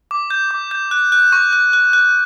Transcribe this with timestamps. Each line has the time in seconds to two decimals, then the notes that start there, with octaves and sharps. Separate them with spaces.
0.11 D6
0.30 G6
0.51 D6
0.71 G6
0.91 F#6
1.12 F#6
1.32 C#6
1.53 F#6
1.73 F#6
1.93 F#6